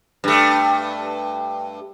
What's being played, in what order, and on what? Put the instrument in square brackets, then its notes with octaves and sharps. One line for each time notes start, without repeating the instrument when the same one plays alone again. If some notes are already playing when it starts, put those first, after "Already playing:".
[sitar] G2 A3